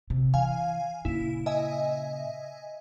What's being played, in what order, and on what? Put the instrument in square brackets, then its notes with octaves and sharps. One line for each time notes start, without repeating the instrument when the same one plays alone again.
[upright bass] C3
[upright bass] E3 [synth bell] F5 G#5
[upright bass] A#2 C#3 [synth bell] E4
[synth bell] D#5 E5 G#5